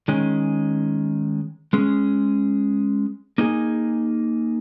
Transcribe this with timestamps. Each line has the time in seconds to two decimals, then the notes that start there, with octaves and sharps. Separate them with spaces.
0.08 D#3 G#3 C#4
1.73 G#3 C#4 G#4
3.38 A#3 D#4 G#4